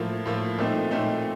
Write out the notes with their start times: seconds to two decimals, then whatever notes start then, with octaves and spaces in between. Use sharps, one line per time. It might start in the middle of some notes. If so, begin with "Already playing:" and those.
Already playing: A2 F3 A#3
0.26 A2 F3 A#3
0.58 A#2 A3 C4 D#4
0.91 A#2 A3 C4 D#4